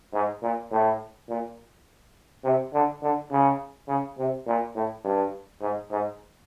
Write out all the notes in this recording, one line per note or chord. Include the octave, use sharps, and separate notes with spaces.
G#2
A#2
A2
A#2
C3
D3
D3
C#3
C#3
C3
A#2
A2
G2
G#2
G#2